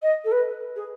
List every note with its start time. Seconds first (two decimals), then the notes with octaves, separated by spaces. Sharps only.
0.02 D#5
0.24 A4
0.32 B4
0.76 G#4